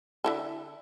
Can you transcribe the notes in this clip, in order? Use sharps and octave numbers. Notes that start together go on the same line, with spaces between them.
D3 E4 A4